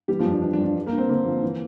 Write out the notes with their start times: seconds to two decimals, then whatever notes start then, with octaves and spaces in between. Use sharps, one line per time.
0.08 E3 G3 G4
0.19 F3 F4
0.26 F2 D4
0.42 E3 D4
0.53 D4
0.59 F2
0.64 D4
0.75 G2
0.86 A#3 A#4
0.92 G2
0.98 C4 C5
1.09 D3 A#3 A#4
1.26 F3
1.43 E3